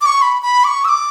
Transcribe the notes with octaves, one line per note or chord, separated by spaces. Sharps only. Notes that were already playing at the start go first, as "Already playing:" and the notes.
D6
C#6
B5
B5
D6
C#6
E6
D6